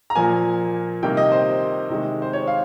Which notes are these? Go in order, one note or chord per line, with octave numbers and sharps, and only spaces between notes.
A#5
A#2 F3 A#3 G#5
C3 D#3 G3 A#3 G5
D#5
C5
C3 D#3 G#3
C5
C#5
F5